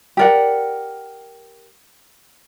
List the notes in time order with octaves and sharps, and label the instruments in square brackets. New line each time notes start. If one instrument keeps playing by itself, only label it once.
[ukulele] G4 A#4 D5 F#5